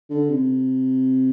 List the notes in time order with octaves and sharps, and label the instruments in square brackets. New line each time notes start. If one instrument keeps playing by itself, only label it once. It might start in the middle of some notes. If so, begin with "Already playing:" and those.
[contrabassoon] D3
C3